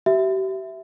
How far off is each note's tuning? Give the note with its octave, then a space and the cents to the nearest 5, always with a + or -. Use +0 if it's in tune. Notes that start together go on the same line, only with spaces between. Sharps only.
G4 -40 E5 +0